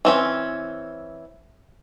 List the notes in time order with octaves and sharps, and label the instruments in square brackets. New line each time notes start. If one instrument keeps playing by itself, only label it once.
[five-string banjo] E3 C4 C#4